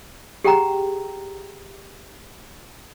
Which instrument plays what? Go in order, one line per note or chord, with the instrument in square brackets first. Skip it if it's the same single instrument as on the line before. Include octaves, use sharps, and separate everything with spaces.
[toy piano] G4 G#4 F#5 G5 A#5